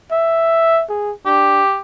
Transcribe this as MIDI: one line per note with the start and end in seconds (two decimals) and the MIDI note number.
0.12 0.84 76
0.89 1.13 68
1.26 1.63 62
1.26 1.79 67